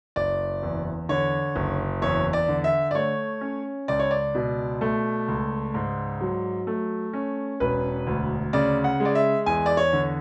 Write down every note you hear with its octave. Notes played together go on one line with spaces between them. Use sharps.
F#1 D5
E2
D3 C#5
F#1
E2 C#5
D5
D3
E5
D5
A3 C#5
C#4
C#2 D5
C#5
D5
B2
A3
C#2
G#2
F#3
A3
C#4
E1 B4
D2
C#3 D5
F#5
G#3
D5
E5
E2 G#5
D5
C#5
D3